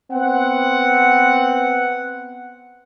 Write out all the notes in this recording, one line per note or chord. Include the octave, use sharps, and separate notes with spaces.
B3 C4 F#5